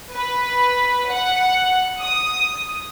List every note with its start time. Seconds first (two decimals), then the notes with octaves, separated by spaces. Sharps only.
0.13 B4
1.10 F#5
2.02 D#6